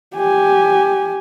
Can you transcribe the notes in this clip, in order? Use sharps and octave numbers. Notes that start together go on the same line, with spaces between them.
G4 G#5